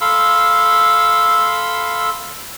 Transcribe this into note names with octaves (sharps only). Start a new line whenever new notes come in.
A4 F5 B5 C6 E6